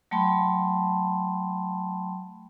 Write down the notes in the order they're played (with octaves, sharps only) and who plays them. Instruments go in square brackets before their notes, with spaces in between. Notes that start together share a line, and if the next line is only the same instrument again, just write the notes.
[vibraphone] F#3 A3 G5 A5 B5 C6